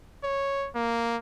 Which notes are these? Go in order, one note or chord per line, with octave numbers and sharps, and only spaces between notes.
C#5
A#3